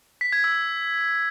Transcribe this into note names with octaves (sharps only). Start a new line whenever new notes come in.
B6
G#6
E6